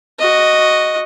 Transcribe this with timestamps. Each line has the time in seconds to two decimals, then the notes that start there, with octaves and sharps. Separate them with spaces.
0.19 F#4 D#5